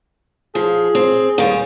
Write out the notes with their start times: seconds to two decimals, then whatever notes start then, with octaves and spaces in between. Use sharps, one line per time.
0.55 F3 G#4
0.95 C4
1.38 D#2 G3